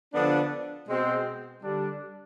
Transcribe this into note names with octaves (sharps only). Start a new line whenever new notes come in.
D3 F3 B3 D4
B2 G#3 C4
D3 G3 D4